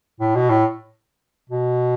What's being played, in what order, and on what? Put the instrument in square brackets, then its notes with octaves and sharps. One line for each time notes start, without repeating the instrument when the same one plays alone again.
[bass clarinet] A2
B2
A2
B2